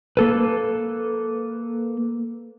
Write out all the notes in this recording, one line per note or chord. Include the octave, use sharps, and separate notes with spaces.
A#3 A4 B4